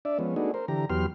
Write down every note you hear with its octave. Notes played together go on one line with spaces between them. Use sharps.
D4 D5 E5
F3 G#3 B3 C#4
A3 B3 D4 D#4 F#4 G#4
A#4 C5
D3 E3 G4 A#5
E2 F#3 B3 G4 C6 F6